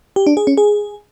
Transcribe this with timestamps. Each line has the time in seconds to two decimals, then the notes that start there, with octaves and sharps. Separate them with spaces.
0.16 G4
0.27 D4
0.37 G#4
0.47 C#4
0.57 G#4